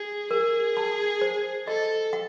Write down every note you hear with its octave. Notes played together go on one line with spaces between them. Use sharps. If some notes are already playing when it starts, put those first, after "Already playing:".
Already playing: G#4
G#4 A#4
A5
C5
A4 D#5
F#5